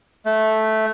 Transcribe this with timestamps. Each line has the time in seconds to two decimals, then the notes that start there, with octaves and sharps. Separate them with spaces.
0.26 A3